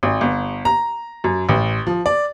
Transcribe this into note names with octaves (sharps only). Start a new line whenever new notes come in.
G#1
G1
A#5
F#2
A1
F3
D5